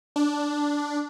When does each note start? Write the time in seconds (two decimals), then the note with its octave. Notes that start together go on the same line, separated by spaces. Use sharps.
0.16 D4